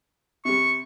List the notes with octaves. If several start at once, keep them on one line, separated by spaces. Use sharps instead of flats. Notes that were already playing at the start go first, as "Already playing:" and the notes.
C3 G3 C#6